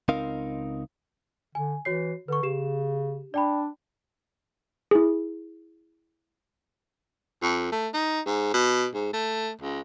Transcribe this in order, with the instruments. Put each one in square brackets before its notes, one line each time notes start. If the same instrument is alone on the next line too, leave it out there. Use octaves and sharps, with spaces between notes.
[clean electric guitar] C#2 C4 D#4 A#4 F5
[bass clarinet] D3 [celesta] G#5
[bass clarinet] E3 [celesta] F#4 C#5 C7
[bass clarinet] D3 [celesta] B4 C#6
[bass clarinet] C#3 [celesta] G4 E7
[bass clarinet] D4 [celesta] D5 G5 B5
[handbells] E4 G#4
[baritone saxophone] F2
A3
D#4
G#2
B2
G#2
A3
C#2